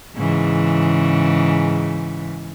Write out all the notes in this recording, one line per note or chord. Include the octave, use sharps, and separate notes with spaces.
G#2 C#3 E3